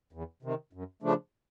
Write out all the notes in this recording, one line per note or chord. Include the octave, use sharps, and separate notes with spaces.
E2
C3 D#3
F#2
C#3 F3 A3 D4